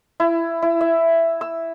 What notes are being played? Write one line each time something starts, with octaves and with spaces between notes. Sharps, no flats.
E4
E4
E5
E6